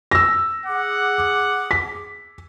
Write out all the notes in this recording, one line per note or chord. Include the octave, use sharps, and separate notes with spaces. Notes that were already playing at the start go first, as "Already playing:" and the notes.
E6 A#6
G#4 F#5 D6
B6